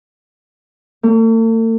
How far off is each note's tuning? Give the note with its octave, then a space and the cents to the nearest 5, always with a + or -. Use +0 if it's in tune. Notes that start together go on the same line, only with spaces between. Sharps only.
A3 +45